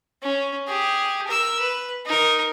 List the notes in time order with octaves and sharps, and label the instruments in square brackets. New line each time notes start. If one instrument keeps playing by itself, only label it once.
[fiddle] C#4
G4 G#4
A#4 E6
B4
D#4 A#4